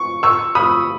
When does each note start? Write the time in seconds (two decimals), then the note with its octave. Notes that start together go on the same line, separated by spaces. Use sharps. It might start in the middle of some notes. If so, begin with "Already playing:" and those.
Already playing: C#6
0.23 C#6 E6
0.55 B5 D#6